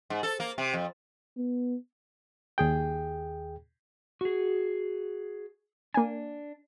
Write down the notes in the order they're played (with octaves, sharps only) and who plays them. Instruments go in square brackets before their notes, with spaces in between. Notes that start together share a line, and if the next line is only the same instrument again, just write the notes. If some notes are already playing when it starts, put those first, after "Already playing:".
[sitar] G#2
A4
A#3
C3
F2
[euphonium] B3
[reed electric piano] D#2 G#4 G5
[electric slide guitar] F#4 G#4
[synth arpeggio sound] A#3 G#5 [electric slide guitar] D4